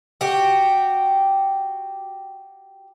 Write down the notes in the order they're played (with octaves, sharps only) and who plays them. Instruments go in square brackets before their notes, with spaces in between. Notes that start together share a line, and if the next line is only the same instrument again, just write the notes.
[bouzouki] F#4 G4